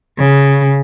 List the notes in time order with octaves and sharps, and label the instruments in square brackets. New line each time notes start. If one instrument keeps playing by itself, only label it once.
[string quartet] C#3